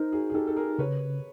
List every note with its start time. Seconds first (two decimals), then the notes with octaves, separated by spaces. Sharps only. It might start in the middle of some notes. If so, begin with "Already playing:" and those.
Already playing: D#4 A#4 C5
0.12 F#4 G#4
0.30 G#4
0.34 D#4 G4 A4
0.47 A4
0.56 G#4 A#4
0.78 C#3 B4 C#5